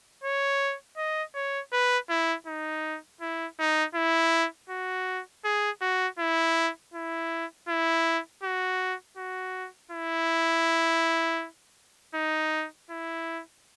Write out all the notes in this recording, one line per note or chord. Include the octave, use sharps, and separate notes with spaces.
C#5
D#5
C#5
B4
E4
D#4
E4
D#4
E4
F#4
G#4
F#4
E4
E4
E4
F#4
F#4
E4
D#4
E4